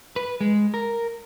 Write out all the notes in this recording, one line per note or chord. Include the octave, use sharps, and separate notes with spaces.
B4
G#3
A#4